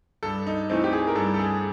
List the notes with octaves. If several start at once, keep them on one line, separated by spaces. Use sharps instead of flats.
G2 A4
D#4
E3 A3 C4 D#4
G4
G#4
A#4
G2 A4
A4
G#4